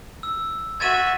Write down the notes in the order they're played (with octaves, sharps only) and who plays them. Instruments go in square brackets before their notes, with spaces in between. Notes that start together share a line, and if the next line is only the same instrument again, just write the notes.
[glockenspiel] E6
[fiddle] F#4 E5 [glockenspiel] G#6 A6 D#7